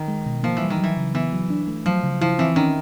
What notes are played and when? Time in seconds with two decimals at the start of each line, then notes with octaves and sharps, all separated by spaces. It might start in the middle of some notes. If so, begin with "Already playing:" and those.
Already playing: D#3
0.08 G#3
0.26 B2
0.43 F3 A#3
0.57 E3 G3
0.70 D#3
0.78 F#3
0.84 E3
0.97 C#3
1.14 E3 B3
1.32 F#3
1.50 D4
1.68 A3
1.86 F3 F#3
2.03 C#3
2.21 F3 E4
2.38 E3 C4
2.56 D#3 C#4